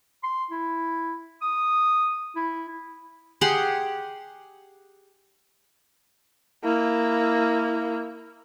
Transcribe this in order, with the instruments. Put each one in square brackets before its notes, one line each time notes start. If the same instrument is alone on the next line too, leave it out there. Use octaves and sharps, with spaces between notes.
[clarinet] C6
E4
D#6
E4
[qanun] G4 G#4 F#5 C6
[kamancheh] A#3 E4